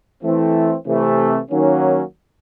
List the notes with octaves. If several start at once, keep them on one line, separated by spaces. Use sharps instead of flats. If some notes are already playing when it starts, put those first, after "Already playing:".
E3 A3 C4
C3 E3 A3
D#3 F#3 A#3 C#4